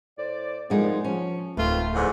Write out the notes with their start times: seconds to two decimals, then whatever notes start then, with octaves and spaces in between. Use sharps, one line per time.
0.18 A2 C5 D5
0.70 F2 A#2 F3 G#3 B3 D#4
1.04 F3 C#4
1.57 D1 F2 D#3 A3 F4 B4
1.94 E2 G#2 D3 F3 G#4